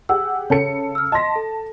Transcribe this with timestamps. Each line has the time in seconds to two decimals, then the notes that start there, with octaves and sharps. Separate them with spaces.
0.09 G4 G#4 F#5 E6
0.50 C#3 A4 C#5 C#7
0.95 E6 F6
1.12 D#5 A5 C6 A#6 B6
1.36 A4